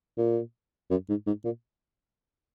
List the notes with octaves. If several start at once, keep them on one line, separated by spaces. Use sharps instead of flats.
A#2
F#2
G#2
G#2
A#2